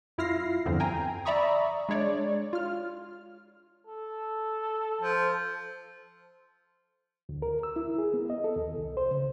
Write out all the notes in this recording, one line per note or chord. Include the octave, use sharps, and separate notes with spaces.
F#2 E4 F4 F6 A#6 C7
E2 G2 D3 F3 B3 C4
G5 G#5 A#5
D5 E5 A#5 B5 C#6 D#6
G#3 D4 C#5 D5
F4 F6
A4
F3
D2
A#4
E6
E4
G#4
B3
D#5
A4
D#2
C2
C5
C#3